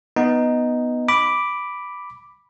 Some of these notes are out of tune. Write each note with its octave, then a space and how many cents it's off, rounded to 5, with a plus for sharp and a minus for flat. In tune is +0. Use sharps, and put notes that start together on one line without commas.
B3 +0 D#4 +0
B5 +0 D6 +0